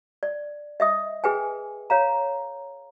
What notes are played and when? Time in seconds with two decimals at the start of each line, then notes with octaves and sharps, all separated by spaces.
0.23 D5
0.80 D#5 E5 D#6
1.24 G#4 B4 G5 G#5
1.90 C#5 F5 A#5